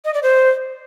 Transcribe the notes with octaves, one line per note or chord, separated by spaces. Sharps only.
D#5
D5
C5